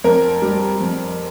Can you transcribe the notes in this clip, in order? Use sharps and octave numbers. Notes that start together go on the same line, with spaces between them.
F2 A#4
G3
F2